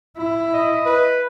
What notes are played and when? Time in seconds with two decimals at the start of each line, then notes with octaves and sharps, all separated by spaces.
0.17 E4
0.53 D#5
0.86 B4